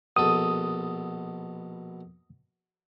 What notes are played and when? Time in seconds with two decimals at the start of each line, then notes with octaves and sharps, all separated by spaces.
0.16 A#1 B2 A4 D#6